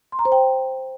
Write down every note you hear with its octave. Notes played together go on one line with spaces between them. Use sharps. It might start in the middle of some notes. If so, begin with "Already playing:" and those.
C6
A#5
C5
G5